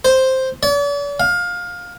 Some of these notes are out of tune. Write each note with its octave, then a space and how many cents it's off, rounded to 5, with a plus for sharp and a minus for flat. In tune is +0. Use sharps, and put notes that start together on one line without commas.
C5 +0
D5 -45
F5 +20